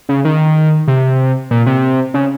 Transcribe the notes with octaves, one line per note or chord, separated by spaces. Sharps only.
C#3
D#3
C3
A#2
C3
C#3